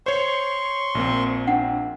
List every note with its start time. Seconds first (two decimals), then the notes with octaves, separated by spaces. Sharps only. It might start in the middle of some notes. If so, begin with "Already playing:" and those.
0.06 C5 C#5 C6 C#6
0.95 A#1 A#3 C4
1.24 A#4
1.47 D4 F#5 G5